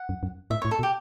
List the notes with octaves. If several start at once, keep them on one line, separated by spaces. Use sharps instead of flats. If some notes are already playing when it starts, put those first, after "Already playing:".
Already playing: F#5
F#2
F#2
A2 E5
C#5
A2
A4
B2
G4